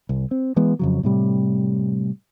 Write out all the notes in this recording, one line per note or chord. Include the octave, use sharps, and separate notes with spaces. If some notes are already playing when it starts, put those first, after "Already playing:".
C2
C4
E3 G#3 B3
F2 C#3 F#3
A2 C3 G3